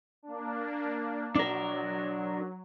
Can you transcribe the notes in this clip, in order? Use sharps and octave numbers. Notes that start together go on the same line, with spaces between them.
A#3 D4
F#3 D4 A#4